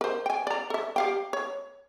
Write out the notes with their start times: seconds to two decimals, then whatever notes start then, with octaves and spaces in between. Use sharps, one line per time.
0.01 A#4 C5
0.26 G5 G#5
0.47 D5 A#5
0.70 A4 E5
0.96 G4 F5 G5
1.33 C#5